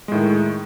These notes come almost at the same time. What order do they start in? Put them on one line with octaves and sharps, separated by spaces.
G#3 A2 D#3